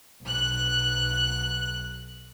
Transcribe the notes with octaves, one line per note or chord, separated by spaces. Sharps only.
B1 F#6